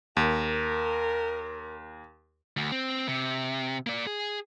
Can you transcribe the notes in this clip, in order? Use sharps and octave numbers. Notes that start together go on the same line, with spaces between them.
D#2 A#4
D2
C4
C3
A#3 D5
G#4